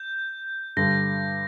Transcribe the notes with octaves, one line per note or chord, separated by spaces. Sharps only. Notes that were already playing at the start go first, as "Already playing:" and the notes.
Already playing: G6
G2 D3 G3 A#6